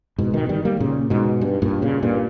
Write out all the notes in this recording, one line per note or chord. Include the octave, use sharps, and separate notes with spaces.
G#2 B2
B2 D#3
D#3 G3
G3 A#3
A#2 C#3
G#2 B2
G2
G2 A#2
A#2 C#3
G2 A#2